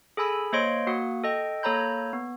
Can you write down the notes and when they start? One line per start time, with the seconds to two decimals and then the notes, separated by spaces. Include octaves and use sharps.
0.17 G#4 A4 G#5 B5 E6
0.53 A#3 C5 C#5 D#5 C6 D7
0.87 A#3 F#4 F#5 D#6
1.24 A4 D#5 G5
1.63 A#3 A4 C#5 A#5 B5 G6
2.13 B3